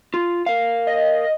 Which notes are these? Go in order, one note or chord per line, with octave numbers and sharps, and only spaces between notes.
F4
A#4 F5
D#5